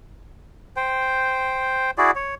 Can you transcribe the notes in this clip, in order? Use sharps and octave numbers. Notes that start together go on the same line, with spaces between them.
C5 G5
E4 F#4 G#4 D5
C#5